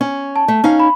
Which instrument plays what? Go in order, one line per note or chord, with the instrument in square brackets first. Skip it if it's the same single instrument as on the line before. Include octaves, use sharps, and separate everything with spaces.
[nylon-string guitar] C#4
[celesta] A5
[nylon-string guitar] A3
C#4 D#4 F5
[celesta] B5